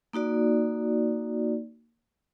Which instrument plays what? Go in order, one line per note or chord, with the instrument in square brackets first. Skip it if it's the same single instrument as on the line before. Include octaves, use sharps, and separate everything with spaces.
[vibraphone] A#3 D#4 F#4 D5